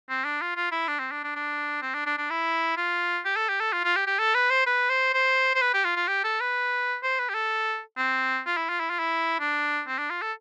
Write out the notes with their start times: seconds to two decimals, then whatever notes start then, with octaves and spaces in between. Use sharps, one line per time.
0.10 C4
0.25 D4
0.41 F4
0.56 F4
0.72 E4
0.88 D4
0.99 C4
1.11 D4
1.24 D4
1.36 D4
1.82 C4
1.95 D4
2.06 D4
2.18 D4
2.30 E4
2.77 F4
3.25 G4
3.36 A4
3.49 G4
3.60 A4
3.73 F4
3.84 F4
3.96 G4
4.07 G4
4.19 A4
4.35 B4
4.50 C5
4.66 B4
4.90 C5
5.14 C5
5.55 C5
5.62 B4
5.74 G4
5.85 F4
5.96 F4
6.08 G4
6.24 A4
6.40 B4
7.03 C5
7.19 B4
7.29 G4
7.34 A4
7.97 C4
8.46 F4
8.57 E4
8.69 F4
8.80 E4
8.90 F4
8.99 E4
9.40 D4
9.87 C4
9.98 D4
10.10 F4
10.22 A4